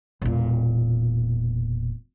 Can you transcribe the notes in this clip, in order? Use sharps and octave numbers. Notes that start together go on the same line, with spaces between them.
E1 A#2